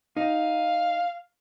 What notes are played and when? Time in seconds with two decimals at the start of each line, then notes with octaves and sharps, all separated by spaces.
0.17 D#4 F5